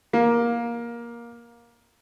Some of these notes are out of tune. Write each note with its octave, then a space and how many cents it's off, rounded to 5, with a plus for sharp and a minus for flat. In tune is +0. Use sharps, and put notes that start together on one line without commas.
A#3 +15